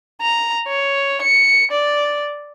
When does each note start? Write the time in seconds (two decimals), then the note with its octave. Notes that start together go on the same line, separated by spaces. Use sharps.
0.22 A#5
0.68 C#5
1.22 C#7
1.71 D5